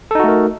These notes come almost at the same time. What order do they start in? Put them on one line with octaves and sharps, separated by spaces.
A4 D#4 F#4 A3 A#4